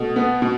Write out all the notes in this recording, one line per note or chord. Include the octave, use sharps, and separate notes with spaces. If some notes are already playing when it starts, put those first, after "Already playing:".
Already playing: B2 A3
B3
B2